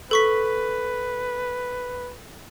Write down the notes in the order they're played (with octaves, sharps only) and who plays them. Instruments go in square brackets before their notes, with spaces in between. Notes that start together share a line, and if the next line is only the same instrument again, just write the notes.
[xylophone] A4 C#6 B6 [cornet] B4